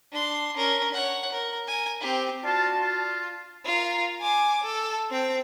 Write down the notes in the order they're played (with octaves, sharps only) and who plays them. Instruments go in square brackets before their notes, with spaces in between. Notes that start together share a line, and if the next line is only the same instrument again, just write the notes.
[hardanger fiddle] D4 C6
C#4 A#4
C#5 F#5
A#4
A#4 G#5
C4 G4
[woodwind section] D4 F#4 A5 [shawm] F4
[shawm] F4
[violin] F4 A#4
G#5 D6
A4
C4 G5